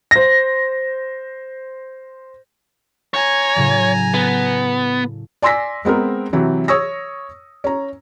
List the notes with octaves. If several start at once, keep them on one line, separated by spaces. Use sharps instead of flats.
C5 A#6
C#5 G#5 A#5
A2 C#3 F#3
B3 A4
D5 G#5 C6 E6 A#6 B6
G#3 B3 C4 A#4
C3 E3 F#3
C#5 C#6 D#6 E6 A#6
C#4 A#5